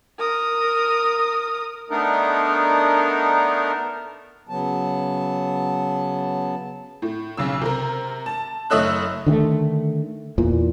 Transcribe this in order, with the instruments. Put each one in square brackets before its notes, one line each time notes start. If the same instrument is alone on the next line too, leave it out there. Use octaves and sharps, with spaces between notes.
[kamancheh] A#4 D#6
[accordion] A3 B3 D4 D#4 A#4
[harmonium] C#3 F#3 B3 A5
[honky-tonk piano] A2
B1 C#3 E6
C3 A#4
A5
F#1 A3 C#5 D#5 E6 F#6
[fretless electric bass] D3 D#3 G3 A3
E2 A#2 E3